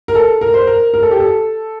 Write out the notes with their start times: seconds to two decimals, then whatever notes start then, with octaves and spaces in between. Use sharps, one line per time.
0.08 A#4
0.15 A4
0.41 A#4
0.54 C5
0.67 A#4
0.94 A#4
1.03 A4
1.11 G4
1.20 A4